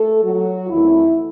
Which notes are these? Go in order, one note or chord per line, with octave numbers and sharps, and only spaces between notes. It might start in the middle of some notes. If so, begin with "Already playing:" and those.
Already playing: A3 A4
F#3 F#4
E2 D#3 A3 C4 E4